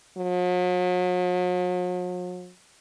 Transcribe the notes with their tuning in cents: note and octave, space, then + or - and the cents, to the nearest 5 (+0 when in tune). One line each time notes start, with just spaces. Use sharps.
F#3 -45